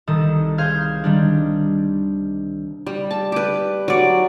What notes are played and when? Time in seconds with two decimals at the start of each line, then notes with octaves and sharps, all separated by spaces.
0.07 C2 D#3 A4 D#6
0.58 G#4 C5 F5 F6 G6 G#6
1.04 D#3 G3 D4
2.87 G3
3.11 A5
3.32 G4 B4
3.88 F#3 D5